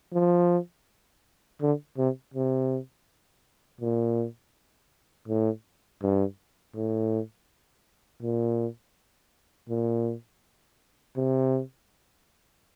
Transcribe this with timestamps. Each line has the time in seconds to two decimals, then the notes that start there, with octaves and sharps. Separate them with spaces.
0.13 F3
1.61 D3
1.98 C3
2.34 C3
3.81 A#2
5.28 A2
6.02 G2
6.75 A2
8.22 A#2
9.69 A#2
11.16 C3